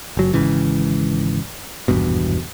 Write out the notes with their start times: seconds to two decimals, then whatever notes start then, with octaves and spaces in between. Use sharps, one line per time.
0.17 F#1 F#3
0.34 G#1 G#2 C#3 E3
1.88 G#1 E2 G2 B2